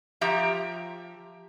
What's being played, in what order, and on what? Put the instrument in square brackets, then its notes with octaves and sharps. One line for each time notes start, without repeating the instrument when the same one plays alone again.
[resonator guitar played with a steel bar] F3 G4 E5 A#5